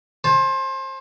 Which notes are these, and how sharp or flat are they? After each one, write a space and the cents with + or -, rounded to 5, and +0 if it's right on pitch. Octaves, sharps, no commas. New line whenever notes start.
C5 +25 A5 -25